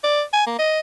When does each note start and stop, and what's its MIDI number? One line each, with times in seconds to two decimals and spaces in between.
0.04 0.22 74
0.33 0.44 80
0.47 0.57 58
0.59 0.80 75